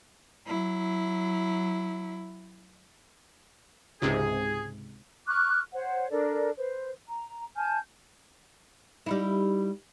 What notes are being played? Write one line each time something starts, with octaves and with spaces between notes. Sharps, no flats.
F#3 E4
C#2 G#2 C3 G#4
C#6 D6 F6 F#6
C5 C#5 F#5
D4 A4 A#4 D5
B4 C5
A#5
G#5 A5 F6 G6
G3 D#4 E4